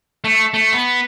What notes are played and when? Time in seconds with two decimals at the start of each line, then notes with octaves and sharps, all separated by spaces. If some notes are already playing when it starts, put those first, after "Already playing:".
0.24 A3
0.54 A3
0.73 B3